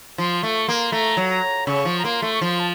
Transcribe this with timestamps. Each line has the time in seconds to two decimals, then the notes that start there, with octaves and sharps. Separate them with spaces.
0.18 F3 C6
0.43 A3 C#6
0.68 A#3 C6
0.92 A3 A#5
1.17 F#3
1.29 A#5
1.67 C#3 C#6
1.85 F3
1.99 A#5
2.04 A#3 C6
2.22 A3
2.33 C#6
2.41 F3 C6
2.59 A5